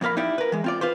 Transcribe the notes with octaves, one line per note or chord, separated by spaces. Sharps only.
F2 A#2 A#3 F5 B5
D#4 E4 G4 D5
A#4 B4
E3 G#3
C4 F4 D5
F4 B4 C5